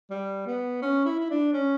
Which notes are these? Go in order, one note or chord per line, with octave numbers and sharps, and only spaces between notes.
G3
B3
C#4
E4
E4
D4
C#4